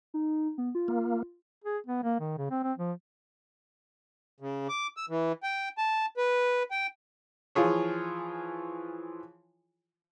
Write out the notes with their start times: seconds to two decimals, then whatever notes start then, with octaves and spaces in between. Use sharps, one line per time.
0.14 D#4
0.58 B3
0.75 F4
0.88 A#3
1.64 G#4
1.87 B3
2.03 A#3
2.20 D#3
2.38 C#3
2.51 C4
2.64 C4
2.78 F3
4.40 C#3
4.69 D6
4.97 E6
5.09 E3
5.43 G5
5.78 A5
6.17 B4
6.71 G5
7.55 E3 F3 F4 G#4 C#5